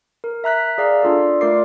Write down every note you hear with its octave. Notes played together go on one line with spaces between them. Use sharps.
A#4
E5 A#5 F#6 B6
G#4 D5 F5 A#5
D4 F4 A4 D5
A3 F4 A#4 D5 D6 C7